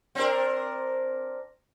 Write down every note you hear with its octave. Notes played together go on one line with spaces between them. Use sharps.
C4 D4 A#4